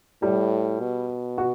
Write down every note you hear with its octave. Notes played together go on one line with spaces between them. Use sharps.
A2 G3
B2
F#4